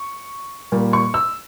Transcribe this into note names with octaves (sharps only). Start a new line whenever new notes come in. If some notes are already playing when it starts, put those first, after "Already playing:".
Already playing: C#6
A#2 G3 A#3
C#6
E6